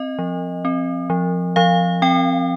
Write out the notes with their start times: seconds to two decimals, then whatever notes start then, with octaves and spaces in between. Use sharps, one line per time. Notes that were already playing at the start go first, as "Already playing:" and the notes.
Already playing: C4 D#5
0.19 F3
0.65 C4
1.10 F3
1.56 F3 F5
2.02 C4 G5